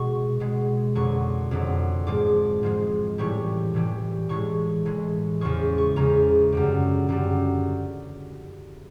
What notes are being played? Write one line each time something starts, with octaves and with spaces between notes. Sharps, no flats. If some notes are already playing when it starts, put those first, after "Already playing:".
Already playing: B2 G#3 C#6
B2 G#3
F2 D3 F#3 C#6
F2 D3 F#3
G#2 F3 G#3 D6
G#2 F3 G#3
A2 E3 G3 C#6
A2 E3 G3
A2 E3 G#3 C#6
A2 E3 G#3
E2 C#3 F3 G#3 C#6
C#6
E2 C#3 F3 G#3 A#5
F#2 D3 G3
F#2 D3 G3